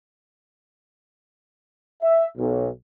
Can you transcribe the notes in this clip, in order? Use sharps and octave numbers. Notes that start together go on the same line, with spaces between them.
E5
B1